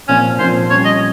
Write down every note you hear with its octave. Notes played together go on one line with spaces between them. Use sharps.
A#2 F3 C4 C#4
A#2 F3 C4 C5
G3 C#4 F4 C#5
D#5